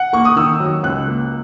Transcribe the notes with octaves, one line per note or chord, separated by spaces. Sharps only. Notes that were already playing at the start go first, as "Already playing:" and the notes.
Already playing: F#5
A#3 C#6
D#6
D#3 E6
F#3
C#2 F#6
A#3